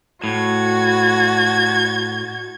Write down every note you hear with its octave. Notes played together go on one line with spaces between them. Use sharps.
A2 F#4 G#6